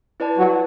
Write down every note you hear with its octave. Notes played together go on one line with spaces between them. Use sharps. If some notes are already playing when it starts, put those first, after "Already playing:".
E4 B4 D5 A5
F#3